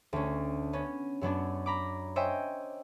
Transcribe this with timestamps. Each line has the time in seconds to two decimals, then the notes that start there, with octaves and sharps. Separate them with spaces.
0.13 D2 C#4
0.73 B3 C#4
1.21 F#2 F#3 B3 D4
1.66 A#5 B5 D6
2.16 C5 C#5 D#5 E5 G5 G#5